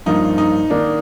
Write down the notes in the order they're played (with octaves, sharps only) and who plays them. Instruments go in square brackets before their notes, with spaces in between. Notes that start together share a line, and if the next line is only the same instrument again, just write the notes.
[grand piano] G2 F3 A#3 F4 [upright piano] D#4
[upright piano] D#4
[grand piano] D#3 A#3 D#4 [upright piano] D4